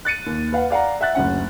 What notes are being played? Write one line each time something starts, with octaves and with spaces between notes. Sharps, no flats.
F#6 A6 C#7 D#7
D#2
B4 F5 F#5
D5 F5 F#5 A#5
E5 F#5 F#6 A6
F#1 D2 C#4 F#5